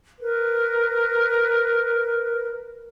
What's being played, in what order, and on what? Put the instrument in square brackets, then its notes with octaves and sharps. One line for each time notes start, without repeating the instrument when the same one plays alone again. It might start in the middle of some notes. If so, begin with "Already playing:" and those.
[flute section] A#4 B4